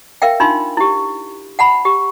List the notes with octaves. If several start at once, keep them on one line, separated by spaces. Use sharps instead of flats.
A#4 E5 F5 G5
D4 D#4 F4 C6
E4 G4
F#5 A5 B5
G4